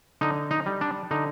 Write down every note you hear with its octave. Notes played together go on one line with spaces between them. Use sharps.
D3 D#4
D#4
G3
D4
D3 D#4